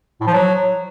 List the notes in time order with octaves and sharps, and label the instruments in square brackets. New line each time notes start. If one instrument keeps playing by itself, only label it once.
[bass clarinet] A2
F3
F#3